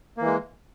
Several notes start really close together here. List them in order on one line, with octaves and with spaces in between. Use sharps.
A#3 E3 G#3